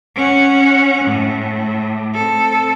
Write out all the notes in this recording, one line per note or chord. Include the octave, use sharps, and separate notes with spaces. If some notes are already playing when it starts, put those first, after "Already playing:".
C#4 F#5
A2
C4 A4